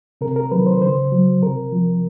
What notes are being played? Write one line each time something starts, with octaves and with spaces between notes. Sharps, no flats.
C3 A#4
A#4
D#3 F#3 B4
C5
C#3 C5
F#3
C3 A#4
F3